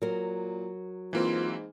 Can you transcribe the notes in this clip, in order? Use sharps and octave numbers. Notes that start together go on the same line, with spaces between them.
A#2 F#3 A#4
G#2 E3 A#3 C4 F4